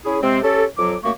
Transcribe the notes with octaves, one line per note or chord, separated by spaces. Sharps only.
C#4 E4 G#4
C3 G#3 C4
C#4 G4 A4
F2 F#3 D6
F#2 A3 A#3 C#6